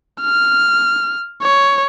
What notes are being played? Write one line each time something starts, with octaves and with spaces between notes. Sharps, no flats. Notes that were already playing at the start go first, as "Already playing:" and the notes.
F6
C#5